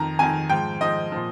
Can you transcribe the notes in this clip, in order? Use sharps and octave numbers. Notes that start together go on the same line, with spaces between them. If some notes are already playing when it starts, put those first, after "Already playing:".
Already playing: F2 D#3 A#5
F2 D#3 G#5
G#2 F3 G5
G#2 F3 D#5
A#2 F3